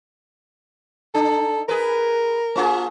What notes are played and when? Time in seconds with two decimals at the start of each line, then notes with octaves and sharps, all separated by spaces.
1.15 D4 A4
1.69 G#4 A#4 B4
2.56 A#3 F4 G#4